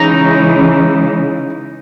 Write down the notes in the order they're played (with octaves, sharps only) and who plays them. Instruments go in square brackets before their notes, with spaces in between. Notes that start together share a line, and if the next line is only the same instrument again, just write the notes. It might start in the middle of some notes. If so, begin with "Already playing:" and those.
Already playing: [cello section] C#3 E3 G#3 [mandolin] D#4